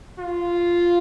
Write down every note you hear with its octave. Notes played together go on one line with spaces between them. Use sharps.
F4